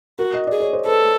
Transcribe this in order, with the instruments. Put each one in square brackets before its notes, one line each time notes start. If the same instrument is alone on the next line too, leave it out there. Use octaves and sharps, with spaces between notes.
[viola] F#4 [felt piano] A#4
[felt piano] D#5
[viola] G#4 [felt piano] D5
[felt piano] C#5
C5
[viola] A4 [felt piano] B4